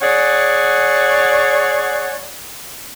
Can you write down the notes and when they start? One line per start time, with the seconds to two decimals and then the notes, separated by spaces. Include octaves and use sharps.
0.02 G#4 C#5 D5 F#5